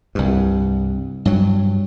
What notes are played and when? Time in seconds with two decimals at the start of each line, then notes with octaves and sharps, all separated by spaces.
0.15 C2 G2
1.25 G2 F#3